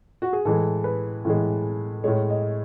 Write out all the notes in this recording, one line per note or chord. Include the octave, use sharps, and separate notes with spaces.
F#4
G#4
A2 E3 G#3 A4
B4
A2 E3 G#3
A2 G#3 C#5
D#5